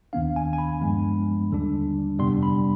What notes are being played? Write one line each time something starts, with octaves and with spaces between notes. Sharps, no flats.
D#2 D#3 B3 D4 F5
G#5
G#5
B5
G2 F3 G#3 B3 D4
D#2 D3 G3 D4
F2 C3 G3 B3 D4 C6
B5